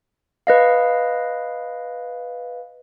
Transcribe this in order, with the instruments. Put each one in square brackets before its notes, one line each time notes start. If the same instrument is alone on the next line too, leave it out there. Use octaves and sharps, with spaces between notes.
[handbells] B4 D#5 F5